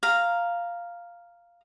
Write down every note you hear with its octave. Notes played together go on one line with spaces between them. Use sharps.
F5 A#5